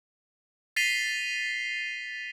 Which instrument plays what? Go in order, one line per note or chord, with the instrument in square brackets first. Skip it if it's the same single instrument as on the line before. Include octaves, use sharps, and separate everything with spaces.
[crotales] A6 B6 C7 D#7 F7 G7